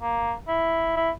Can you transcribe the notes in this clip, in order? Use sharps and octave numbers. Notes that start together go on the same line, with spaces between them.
A#3
E4
E4